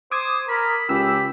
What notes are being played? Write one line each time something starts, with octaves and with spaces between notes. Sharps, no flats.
C5 D6 D#6 G#6
A#4 B5
C#2 G4 B5 E6